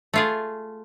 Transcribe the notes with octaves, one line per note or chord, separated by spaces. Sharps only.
A3 F4 G#4